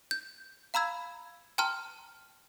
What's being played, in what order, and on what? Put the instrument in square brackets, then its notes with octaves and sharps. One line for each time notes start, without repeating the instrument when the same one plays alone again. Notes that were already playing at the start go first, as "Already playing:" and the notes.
[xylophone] G6
F5 A#5 B5 E6 G#6
G5 A5 A#5 C6 F6